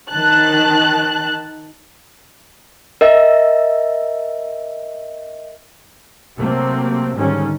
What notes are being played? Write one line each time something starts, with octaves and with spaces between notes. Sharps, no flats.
D#3 A5 F#6
A#4 D#5 E5
C3 F#3 A3 A#3 C4
G#2 D3 D#3 G3 C#4